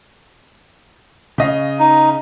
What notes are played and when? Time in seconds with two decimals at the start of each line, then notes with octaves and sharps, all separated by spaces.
1.38 C#3 D#5 F5
1.79 D#4